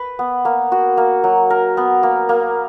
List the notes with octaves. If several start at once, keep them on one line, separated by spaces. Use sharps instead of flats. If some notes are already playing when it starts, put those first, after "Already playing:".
Already playing: B4
B3
A#3
F#4
A#3
F#3
A#4
B3
A#3
A#3